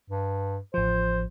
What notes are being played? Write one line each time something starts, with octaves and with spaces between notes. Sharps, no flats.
G2
A1 F3 C5